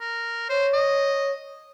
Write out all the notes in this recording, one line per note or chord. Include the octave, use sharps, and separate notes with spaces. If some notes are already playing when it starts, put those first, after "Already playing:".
A#4
C5 C#5
D#5